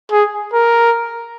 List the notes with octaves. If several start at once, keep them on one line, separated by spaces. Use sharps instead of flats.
G#4
A#4